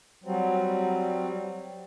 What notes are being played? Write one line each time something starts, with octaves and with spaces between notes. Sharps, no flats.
F#3 G3 C4